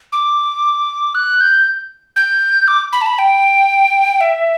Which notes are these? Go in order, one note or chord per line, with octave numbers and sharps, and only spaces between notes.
D6
F#6
G6
G6
D6
B5
A5
B5
G5
E5